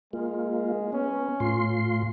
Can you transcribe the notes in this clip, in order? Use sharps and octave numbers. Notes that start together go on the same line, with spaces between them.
G#3 A#3 F4
B3 C#4
A2 F4 C6